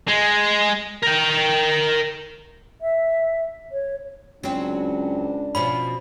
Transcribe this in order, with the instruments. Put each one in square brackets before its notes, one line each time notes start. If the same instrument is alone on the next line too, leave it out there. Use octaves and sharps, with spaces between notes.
[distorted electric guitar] G#3
A#4 G5
[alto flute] E5
C#5
[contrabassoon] C#2 [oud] F#3 C4 [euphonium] D4
[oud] B2 F3 C#4 [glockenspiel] B5